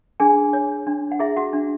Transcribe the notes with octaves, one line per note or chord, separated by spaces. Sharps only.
D4 G#4 G#5
C#5
D4
F#5
E4 G#4 E5
F#4 F#5
D4